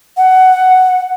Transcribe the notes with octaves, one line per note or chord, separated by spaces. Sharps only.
F#5